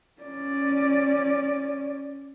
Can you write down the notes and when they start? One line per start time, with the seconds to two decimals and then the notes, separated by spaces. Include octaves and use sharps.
0.22 C#4 D5